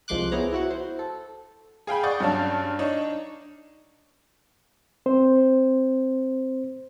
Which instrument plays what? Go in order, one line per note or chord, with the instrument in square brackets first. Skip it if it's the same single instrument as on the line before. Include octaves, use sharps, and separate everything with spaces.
[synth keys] C2 F3 G#3 C6 D6 F#6
B3 E4 G#4 C5 C#5 A#5
E4 F#4 F#5
C5
A4
[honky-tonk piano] G#4 F5 G5 B5
D5 F#5 C#6 D#6 G6 A6
G2 F#3 C#4 F5 A5 F6
D4 D#4 C#5
[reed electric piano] C4 C5